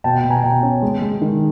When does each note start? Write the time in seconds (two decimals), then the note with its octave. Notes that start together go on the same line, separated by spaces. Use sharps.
0.04 B2 G5 A5
0.17 G5 A5
0.24 B2
0.30 G#5 A#5
0.43 B2 G5 A5
0.63 C#4
0.82 G#3
1.01 G#3
1.22 D#3